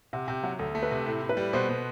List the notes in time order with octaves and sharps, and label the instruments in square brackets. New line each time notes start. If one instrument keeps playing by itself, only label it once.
[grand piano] C3 [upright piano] F#5
[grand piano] C3 [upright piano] G5
[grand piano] F#3 [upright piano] F#5
[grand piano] D2 [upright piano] A4
[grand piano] A3
[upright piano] B4
[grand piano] C3
[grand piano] A2 [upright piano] A4
[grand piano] A2
[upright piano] B4
[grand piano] G3
[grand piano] B2 [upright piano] C5
[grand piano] B2